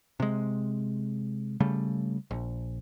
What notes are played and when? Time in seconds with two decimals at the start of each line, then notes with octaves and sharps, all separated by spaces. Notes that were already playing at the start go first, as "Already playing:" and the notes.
0.20 C3 G#3
1.60 C#3 G3 A3
2.31 A#1